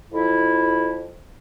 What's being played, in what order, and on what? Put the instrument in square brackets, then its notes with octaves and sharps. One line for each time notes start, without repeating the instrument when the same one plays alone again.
[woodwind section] F2 E4